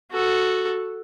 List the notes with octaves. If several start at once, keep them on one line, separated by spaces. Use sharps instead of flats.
F#4 A4